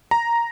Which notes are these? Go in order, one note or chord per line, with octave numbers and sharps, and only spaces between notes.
A#5